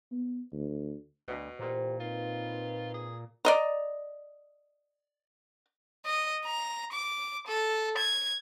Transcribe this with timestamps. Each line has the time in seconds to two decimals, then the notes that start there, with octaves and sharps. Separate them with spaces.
0.12 B3
0.52 D2
1.28 D2 B2
1.59 A#2 E3 G4 C5
2.00 C4 D#4 F4 B4
2.94 G#4
3.45 D5 D#5 A#5
6.06 D#5
6.45 A#5
6.92 D6
7.47 A4
7.98 G#6